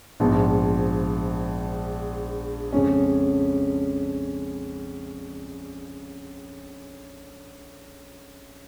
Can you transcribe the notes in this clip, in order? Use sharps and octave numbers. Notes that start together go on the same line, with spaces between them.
A#1 G#2 F3 B3
F2 C#3 G#3 C#4